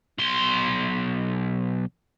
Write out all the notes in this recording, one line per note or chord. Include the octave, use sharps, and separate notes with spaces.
B1 C6